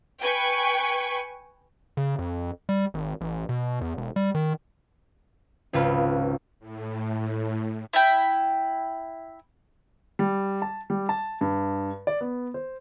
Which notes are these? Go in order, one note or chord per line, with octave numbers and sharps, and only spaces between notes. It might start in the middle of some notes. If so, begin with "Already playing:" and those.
B4 G5 G#5 C#6
C#3
F2
G3
G#1
A1
B2
E2
E1
G3
D#3
G#1 C#2 F4 B4
A2
E4 G5
G3
A5
G3
A5
G2
D5
B3
C5